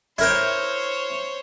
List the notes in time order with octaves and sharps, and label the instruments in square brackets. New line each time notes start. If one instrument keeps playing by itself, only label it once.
[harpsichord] E4 A#4 G5 [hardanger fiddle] C5 C#5